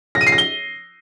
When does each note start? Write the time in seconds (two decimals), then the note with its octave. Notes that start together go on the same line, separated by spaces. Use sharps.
0.15 A#6
0.21 D#7
0.27 C7
0.32 A#6
0.38 G7